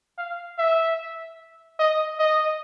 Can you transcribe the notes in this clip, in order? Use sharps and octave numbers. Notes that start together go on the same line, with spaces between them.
F5
E5
D#5
D#5